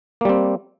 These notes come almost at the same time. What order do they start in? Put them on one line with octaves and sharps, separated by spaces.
A#3 G3 C4